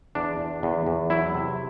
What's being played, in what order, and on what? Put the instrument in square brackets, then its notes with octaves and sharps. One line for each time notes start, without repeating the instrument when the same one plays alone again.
[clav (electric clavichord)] E2 D4
E2
E2
E2
F#3 E4
C3